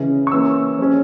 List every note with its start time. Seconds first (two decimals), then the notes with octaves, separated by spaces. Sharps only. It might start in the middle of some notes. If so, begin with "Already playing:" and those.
Already playing: C#3 E3 G#3 C#4
0.27 C#6
0.32 E3 A#3 C#4 E6
0.79 F3 G#3 C#4